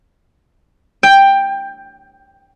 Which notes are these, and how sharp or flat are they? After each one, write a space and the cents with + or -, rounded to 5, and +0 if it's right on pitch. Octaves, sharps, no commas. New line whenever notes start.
G5 +10